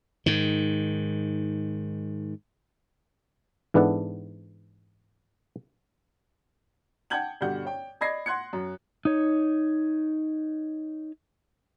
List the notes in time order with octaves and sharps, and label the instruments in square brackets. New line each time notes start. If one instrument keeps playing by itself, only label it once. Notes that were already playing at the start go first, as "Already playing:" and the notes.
[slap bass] G#2 D#3
[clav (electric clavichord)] G#2 E3 B3 D4 A4 F#5
[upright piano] F#5 G5 A5 G6 G#6 F#7
G2 B2 D3 G4 F#5 G6
C#5 G5
D5 D#5 B5 G#6 A#6 C7
F#5 C6 F#6 G#6 C#7
F#2
[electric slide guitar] D#4 C#5